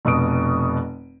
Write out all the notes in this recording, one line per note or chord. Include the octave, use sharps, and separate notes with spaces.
F1 B2 D#6 D7